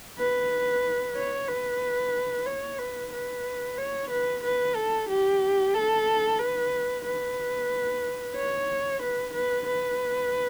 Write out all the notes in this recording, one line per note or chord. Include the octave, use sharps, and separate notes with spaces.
B4
C#5
B4
C#5
B4
B4
C#5
B4
B4
A4
G4
A4
B4
B4
C#5
B4
B4
B4